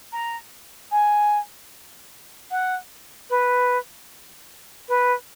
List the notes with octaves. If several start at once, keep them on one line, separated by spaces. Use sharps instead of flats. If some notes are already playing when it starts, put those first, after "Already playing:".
A#5
G#5
F#5
B4
B4